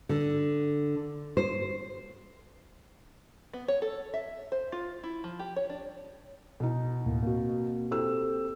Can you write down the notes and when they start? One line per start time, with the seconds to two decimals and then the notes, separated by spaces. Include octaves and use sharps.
0.09 D3
1.37 C5
3.53 B3
3.68 C#5
3.82 A4
4.14 E5
4.52 C5
4.72 F4
5.03 E4
5.24 F3
5.39 G4
5.56 C#5
5.70 D4
6.60 B2 D#4
7.06 D2 A2 A#3
7.23 A#3 C4 F#4
7.91 C4 G4 A4 E6